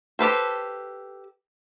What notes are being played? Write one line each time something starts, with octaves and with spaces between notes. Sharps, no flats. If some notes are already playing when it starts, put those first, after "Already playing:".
G4 A4 B4 C5